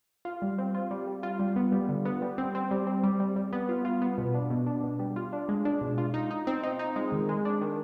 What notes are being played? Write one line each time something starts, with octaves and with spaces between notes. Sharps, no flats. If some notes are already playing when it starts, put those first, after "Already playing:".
F4
G3
C4
F4
G3
G3
F4
G3
B3
G3
D3
B3
G3
C4
C4
G3
C4
G3
G3
G3
B3
F4
F4
B3
B2
D4
B2
D4
B2
G3
F4
D4
G#3
D4
B2
F4
D#4
D#4
C4
D#4
D#4
G#3
D#3
G#3
D4
D#3